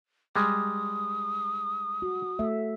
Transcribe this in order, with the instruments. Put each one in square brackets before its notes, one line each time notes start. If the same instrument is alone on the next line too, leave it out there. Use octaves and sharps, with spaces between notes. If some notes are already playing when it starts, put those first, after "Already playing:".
[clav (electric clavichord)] G3 G#3 [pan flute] D#6
[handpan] F#4
A3 E5